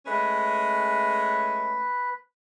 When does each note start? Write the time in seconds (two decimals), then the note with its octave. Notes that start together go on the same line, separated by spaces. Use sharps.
0.06 G#3 A3 C#4 B4